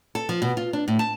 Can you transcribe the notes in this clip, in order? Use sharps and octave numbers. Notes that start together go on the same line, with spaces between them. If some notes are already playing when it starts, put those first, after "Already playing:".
A4
F3
B2
F4
D4
A2
A5